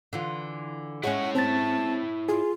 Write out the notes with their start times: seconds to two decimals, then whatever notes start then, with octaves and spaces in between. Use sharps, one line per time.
0.13 D3 E3 F4
1.03 G#3 C#4 E4 C#5 F#5
1.35 C4 A5 A6
2.29 F4 G#4